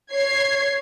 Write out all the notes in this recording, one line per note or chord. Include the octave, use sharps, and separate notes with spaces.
C#5 G#6 C7